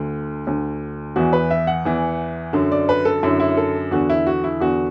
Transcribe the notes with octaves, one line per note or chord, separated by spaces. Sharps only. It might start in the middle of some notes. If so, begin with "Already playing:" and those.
Already playing: D2 D3
D2 D3
E2 E3 F#4
B4
E5
F#5
E2 E3
F#2 D3
D5
B4
A4
F#2 D3 E4
E4
A4
E2 D3 F#4
E4
F#4
E4
E2 D3 F#4